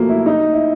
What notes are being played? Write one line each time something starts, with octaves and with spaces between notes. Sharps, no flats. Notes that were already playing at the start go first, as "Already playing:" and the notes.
Already playing: B2 F3 F#3 A3 A#3
E4
D#4
E4